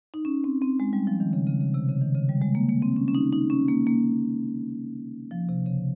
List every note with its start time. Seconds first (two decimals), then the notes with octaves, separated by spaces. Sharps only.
0.14 D#4
0.25 C#4
0.44 C4
0.62 C4
0.80 G#3
0.93 G3
1.07 F3
1.20 D#3
1.33 C#3
1.47 C#3
1.61 C#3
1.74 C3
1.88 C#3
2.01 D#3
2.15 C#3
2.29 G3
2.41 G#3
2.55 A#3
2.69 A#3
2.82 C4
2.96 C#4
3.08 C#4
3.15 D#4
3.33 D#4
3.50 C#4
3.69 A#3
3.87 A#3
5.31 F3
5.49 C3
5.66 C#3